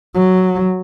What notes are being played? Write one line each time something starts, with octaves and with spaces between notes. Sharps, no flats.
F#3